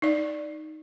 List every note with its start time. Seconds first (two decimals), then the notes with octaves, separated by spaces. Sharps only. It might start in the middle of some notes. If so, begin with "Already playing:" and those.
0.02 D#4 D5